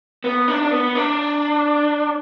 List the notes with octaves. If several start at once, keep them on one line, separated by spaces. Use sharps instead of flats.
B3
D4
D4
B3
D4